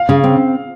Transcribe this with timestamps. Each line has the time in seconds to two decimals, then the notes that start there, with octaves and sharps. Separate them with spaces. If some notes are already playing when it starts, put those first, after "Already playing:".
Already playing: F5
0.09 C#3
0.24 C4